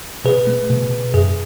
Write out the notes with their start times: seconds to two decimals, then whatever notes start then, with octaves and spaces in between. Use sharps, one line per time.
0.25 B2 G#4 B4
0.47 A3
0.70 B2
0.91 B2
1.14 F#2 G#4